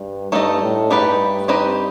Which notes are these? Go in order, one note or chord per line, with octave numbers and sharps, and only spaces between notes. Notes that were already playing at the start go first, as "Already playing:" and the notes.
Already playing: G2
G2 A3 D#4 A4 D#5
A2
G2 A3 D#4 G4 B4
C4 D#4 G4 B4 D#5